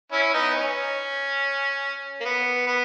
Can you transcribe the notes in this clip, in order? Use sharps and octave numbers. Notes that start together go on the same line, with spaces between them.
C#4 E4
B3 D#4
C#4
A#3
B3
B3